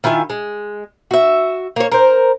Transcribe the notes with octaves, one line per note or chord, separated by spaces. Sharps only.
D#3 E4 F4 G#5
G#3
F#4 E5
A#3 C#5
A#4 C5